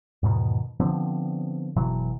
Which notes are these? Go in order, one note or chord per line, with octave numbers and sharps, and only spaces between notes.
E2 G#2 B2 D#3
D3 F3 B3 C4
F#1 B2 E3 F#3